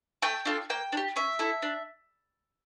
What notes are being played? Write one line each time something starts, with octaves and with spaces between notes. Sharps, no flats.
A3 G5
D4 F4 A4
A#3 G5
D4
G4
C#4 E5
E4 A4
D4